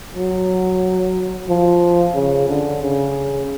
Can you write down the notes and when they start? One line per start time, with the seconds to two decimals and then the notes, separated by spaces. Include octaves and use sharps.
0.16 F#3
1.49 F3
2.15 C#3
2.49 D3
2.82 C#3